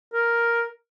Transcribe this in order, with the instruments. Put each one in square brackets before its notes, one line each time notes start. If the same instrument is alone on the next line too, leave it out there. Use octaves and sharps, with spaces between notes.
[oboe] A#4